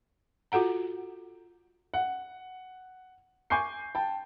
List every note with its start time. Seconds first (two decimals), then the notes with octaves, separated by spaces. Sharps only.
0.52 F4 F#4 A4 F#5 A#5
1.94 F#5
3.50 G#5 C#6 D6 G6 C7
3.95 G5 A5